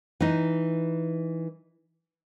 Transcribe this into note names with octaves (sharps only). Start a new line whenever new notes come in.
E3 D#4